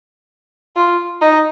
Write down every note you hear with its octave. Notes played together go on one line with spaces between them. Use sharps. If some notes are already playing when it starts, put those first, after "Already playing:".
F4
D#4